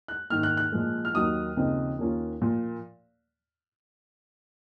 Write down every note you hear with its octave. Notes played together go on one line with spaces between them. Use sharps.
F#6
G#2 D#3 A#3 F6
F#6
F#6
A#2 F3 G#3
F6
D#2 D#3 F#3 A#3 D#4 D#6
D#2 C#3 F3 C4 D#4
D#2 D#3 A#3 C#4 F4
A#2 F3 A#3 F4